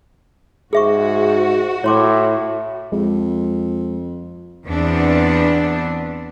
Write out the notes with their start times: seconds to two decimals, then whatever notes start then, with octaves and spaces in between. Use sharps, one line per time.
0.73 G#2 F#4 G#4 E5 C#6
1.84 A2 E4 C#5 C6 D6
2.92 F2 G#3
4.66 E2 B3 C4 D4